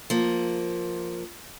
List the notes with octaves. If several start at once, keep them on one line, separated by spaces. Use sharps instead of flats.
F3 A#3